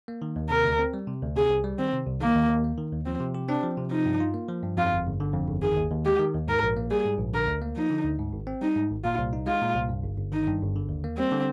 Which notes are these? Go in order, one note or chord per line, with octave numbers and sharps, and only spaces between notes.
A#3
D#3
D#2
C3 A#4
D2
C4
G3
C3
D2
C3 G#4
C2
G3
D#3 C4
C3
C2
D#3 A#3
D#2
D#2
A#3
D#3
D#2
F3 C4
C3
G4
C4 D4
F3
C3
F3 D#4
G2
F4
A#3
F3
G2
F2 F4
G1
G1
D3
F2
G1
D#3 G#4
D#2
D#2
G#3 G4
D#3
D#2
G#2 A#4
A#1
A#3
G3 G#4
G#2
A#1
D3 A#4
D2
A#3
F3 D#4
D3
D2
G#2
G#1
C4
G3 D#4
G#2
G#1
A#2 F4
C2
D#4
G#3 F4
A#2
C2
G2
G1
G1
D#3 D#4
G2
G1
D3
D#2
A#3
G3 C4
D3